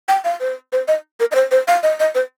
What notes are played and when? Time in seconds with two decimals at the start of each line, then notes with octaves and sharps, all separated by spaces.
0.09 G5
0.24 F5
0.40 C5
0.72 C5
0.88 D#5
1.20 A#4
1.31 D#5
1.35 C5
1.51 C5
1.68 F5
1.83 D#5
2.00 D#5
2.15 C5